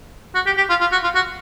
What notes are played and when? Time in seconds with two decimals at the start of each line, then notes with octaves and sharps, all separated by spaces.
0.35 F#4
0.46 G4
0.57 G4
0.69 F4
0.80 F4
0.92 F#4
1.03 F4
1.15 F#4